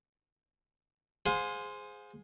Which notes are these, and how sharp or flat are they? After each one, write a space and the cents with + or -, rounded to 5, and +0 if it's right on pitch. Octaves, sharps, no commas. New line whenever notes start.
G#4 +0 C5 -10 F5 +40